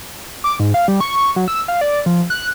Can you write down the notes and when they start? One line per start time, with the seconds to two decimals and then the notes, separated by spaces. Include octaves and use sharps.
0.44 D6
0.60 G#2
0.74 F5
0.88 G3
1.01 C#6
1.36 F#3
1.48 E6
1.68 F5
1.81 D5
2.06 F3
2.30 F#6